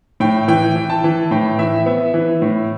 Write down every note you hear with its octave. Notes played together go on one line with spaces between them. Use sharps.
A2 G5
E3 G5
E3
A5
E3
A2 G5
E3 E5
B3 E5
E3
A2